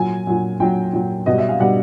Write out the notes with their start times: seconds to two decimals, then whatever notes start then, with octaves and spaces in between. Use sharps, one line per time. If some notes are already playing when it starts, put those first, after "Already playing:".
Already playing: A#2 F#3 G#5
0.27 A#2 F#3
0.60 A#2 F#3 G5
0.93 A#2 F#3
1.26 B2 G3 D#5
1.38 E5
1.49 F5
1.60 B2 G3 F#5